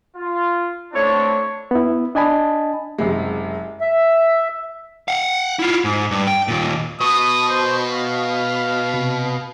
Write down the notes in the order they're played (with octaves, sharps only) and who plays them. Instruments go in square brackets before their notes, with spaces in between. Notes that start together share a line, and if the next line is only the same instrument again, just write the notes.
[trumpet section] F4
[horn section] A3 C#5 [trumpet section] C4 D4 E4
[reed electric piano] B3 E4
D4 D#5 G#5 A5 B5
[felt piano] F#1 C3 G#3
[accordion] E5
[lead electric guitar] F5 F#5
E4 F4
G#2
G2
G5
D#2 A#2
[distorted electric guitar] B2 [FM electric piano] C#6 [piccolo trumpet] D#6
[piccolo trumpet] C5
F5
[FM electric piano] C3